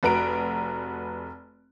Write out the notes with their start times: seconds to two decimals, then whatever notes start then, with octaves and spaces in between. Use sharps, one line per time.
0.03 F1 F#4 B4 A#5 D7